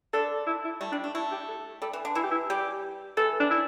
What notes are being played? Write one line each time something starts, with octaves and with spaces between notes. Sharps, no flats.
D3 D4 A4
E4
E4
G3 A3
G3 D4
A3 D4
A3 E4
G4
A4
G3 A4
E3
D3
E3 E4
G4
E4
G3 G4
E3 A4
D4
E4